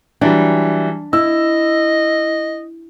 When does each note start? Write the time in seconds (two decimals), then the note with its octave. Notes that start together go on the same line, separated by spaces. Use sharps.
0.21 E3 F#3 G3 D4
1.13 E4 D#5 E6